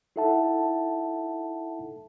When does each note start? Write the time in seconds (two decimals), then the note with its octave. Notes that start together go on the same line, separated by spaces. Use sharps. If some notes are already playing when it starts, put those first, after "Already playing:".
0.16 D#4 E4 A4 E5 F#5 A5